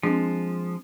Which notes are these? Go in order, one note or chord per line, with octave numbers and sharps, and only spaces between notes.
F3 G#3 C4 D4